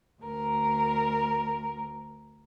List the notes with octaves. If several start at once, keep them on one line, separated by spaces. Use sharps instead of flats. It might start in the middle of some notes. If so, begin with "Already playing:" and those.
D2 A#4